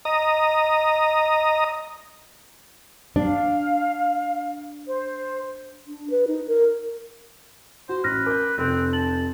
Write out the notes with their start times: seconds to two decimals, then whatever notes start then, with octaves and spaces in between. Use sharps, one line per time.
0.05 D#5 A#5 D#6
3.16 D4 F5
4.87 C5
5.87 D4
6.10 B4
6.27 D#4
6.48 A#4
7.89 F#4 C5
8.04 A1 B4 F6 A#6
8.26 A#4 D6 G6
8.58 F1 C4 F#6
8.93 A5 F#7